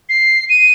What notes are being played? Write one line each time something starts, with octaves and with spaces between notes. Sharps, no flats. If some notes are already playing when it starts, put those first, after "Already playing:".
C7
D#7